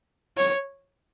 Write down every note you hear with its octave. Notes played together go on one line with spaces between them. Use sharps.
C#5